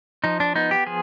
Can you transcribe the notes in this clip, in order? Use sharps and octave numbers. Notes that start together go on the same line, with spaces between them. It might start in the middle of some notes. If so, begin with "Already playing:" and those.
F3 D#4
D4
B3 D#4
G4
F3 G#4